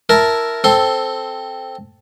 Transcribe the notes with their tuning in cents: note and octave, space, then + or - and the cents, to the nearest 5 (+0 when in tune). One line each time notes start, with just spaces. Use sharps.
E4 +0 A#4 +0 A5 +0
C4 +0 A4 +0 C6 +20